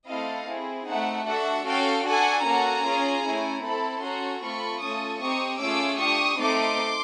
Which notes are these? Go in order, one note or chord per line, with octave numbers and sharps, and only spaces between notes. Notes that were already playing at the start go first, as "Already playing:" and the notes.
A3 C4 E4 A4 D#5 F5
C4 E4 G#4
A3 C4 D#4 E5 F#5
D4 F#4 A4 E5 F#5
C#4 F#4 A4 F5 G5
D4 F#4 A4 F#5 G#5
A#3 C#4 F#4 A4 G#5 A#5
C#4 F4 G#4
A3 C#4 E4
C4 E4 A4 A5 B5
C#4 F#4 A4 A#5 C6
A3 C4 F4 A4 B5 C#6
A3 C#4 F4 A4 C#6 D#6
C4 D#4 G4 C#6 D#6
A3 C#4 F4 G#4 D6 E6
D4 G4 C#6 D#6
A3 C4 D#4 C6 D6